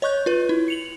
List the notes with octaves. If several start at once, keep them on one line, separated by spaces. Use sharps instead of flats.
C#5 D#5 C#6 F#6 G6
F4 B4
E4
C#7 F7 F#7